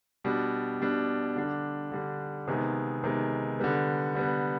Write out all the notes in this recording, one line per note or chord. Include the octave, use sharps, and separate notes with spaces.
B2 G3 D4
B2 G3 D4
D3 G3 D4
D3 G3 D4
C3 D#3 G#3 B3
C3 D#3 G#3 B3
D3 G3 B3
D3 G3 B3